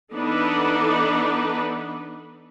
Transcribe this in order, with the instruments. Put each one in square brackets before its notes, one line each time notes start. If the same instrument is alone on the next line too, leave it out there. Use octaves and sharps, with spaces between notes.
[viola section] E3 B3 D4 D#4 A4 B4